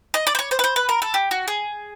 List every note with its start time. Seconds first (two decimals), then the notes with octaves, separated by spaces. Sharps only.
0.14 D#5
0.27 D5
0.35 C5
0.39 C#5
0.51 C5
0.59 B4
0.64 C5
0.76 B4
0.89 A#4
1.02 A4
1.14 G4
1.31 F#4
1.48 G#4